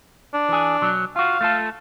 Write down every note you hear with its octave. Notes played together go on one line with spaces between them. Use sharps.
D4
E3 G#4
B1 F#3
F4 F#4 F5
A3 F4 A4